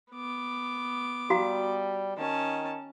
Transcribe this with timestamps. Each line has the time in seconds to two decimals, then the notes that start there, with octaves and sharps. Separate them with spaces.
0.12 B3 D6
1.30 G3 F#4 F5 A#5
2.17 D#3 C#4 A5